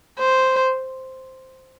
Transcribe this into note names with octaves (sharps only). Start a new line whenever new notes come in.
C5